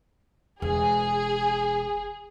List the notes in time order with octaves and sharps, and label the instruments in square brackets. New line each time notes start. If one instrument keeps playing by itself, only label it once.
[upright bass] E1 [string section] G#4